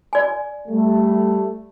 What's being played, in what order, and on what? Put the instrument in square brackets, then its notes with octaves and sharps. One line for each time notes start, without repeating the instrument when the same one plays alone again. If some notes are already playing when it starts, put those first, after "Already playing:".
[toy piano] D5 G#5
[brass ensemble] G3 A3